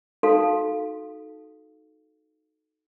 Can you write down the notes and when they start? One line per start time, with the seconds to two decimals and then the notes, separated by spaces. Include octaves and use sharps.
0.23 D#4 F#4 A4 F5 C6